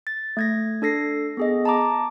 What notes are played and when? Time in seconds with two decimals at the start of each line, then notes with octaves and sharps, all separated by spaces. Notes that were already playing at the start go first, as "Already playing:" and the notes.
0.07 A6
0.37 A3 G#6 A#6
0.82 D4 A4 A#6 C7
1.37 B3 G#4 D#5
1.65 A5 A#5 D6